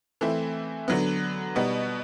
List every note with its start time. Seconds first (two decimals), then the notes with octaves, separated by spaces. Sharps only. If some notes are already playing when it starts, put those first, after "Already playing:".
0.21 E3 A3 C4 E4
0.88 D3 F#3 B3
1.55 B2 G3 B3 D#4